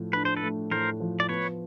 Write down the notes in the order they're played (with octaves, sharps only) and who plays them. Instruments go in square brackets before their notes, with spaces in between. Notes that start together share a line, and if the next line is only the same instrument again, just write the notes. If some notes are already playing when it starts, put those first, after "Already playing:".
Already playing: [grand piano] A2 F3 A3
[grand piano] D4 [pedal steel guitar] B4
[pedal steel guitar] C5
A4 B4
[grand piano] A3
[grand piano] A2 [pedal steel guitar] A#4 C5
[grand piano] F3
[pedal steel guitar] D5
[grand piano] B3 [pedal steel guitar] B4 C#5